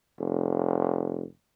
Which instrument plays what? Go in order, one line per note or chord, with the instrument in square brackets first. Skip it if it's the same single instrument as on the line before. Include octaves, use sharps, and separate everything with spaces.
[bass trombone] F1